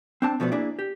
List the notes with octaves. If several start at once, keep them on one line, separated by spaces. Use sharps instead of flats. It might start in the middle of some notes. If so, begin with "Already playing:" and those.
C4 D4 A5
B2 F3 A3 B3 D4
A#3 D4 E4 G#4 D5
G4